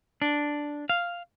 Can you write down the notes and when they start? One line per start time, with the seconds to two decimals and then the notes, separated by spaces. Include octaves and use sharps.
0.22 D4
0.89 F5